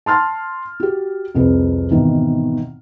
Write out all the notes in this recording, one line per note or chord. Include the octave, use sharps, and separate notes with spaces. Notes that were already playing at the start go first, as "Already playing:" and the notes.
A5 C6 F6 A6
F#4 G4
C2 F2 G#4 B4
G#1 B2 D#3 E3